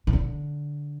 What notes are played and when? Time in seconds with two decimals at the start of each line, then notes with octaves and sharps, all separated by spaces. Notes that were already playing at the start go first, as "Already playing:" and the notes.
0.07 C3
0.13 D3